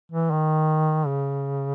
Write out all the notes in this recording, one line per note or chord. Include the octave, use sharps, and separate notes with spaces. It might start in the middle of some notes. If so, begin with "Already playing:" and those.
E3
D#3
C#3